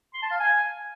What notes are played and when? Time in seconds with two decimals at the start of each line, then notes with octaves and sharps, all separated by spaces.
0.14 C6
0.22 A5
0.31 F5
0.40 G#5